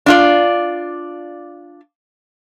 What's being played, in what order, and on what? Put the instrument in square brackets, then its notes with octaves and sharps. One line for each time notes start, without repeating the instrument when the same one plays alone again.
[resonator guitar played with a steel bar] D4 F4 D5